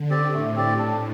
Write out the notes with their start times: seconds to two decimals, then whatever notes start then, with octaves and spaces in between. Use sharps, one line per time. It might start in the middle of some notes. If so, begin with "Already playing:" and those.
Already playing: D3
0.10 C4 G4 D5
0.33 A2 A3
0.55 C4 G4 D5
0.78 D4